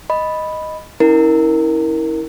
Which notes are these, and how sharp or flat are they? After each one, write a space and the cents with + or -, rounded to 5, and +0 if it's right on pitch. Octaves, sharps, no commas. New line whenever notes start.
D#5 +0 B5 +0
C#4 +10 E4 -30 A#4 +0